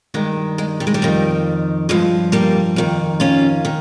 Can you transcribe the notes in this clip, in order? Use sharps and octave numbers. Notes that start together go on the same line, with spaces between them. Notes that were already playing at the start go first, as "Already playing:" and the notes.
G2 D#3 G#3
G#3
G3
G#3
G3
F2 D#3
G2 F3 G#3
G3 A#3
F2 D#3
C#4 F4
D#3